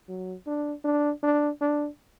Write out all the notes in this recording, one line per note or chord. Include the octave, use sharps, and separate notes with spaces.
F#3
D4
D4
D4
D4